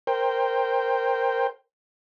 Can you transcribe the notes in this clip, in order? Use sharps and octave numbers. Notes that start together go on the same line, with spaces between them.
A#4 C5 G5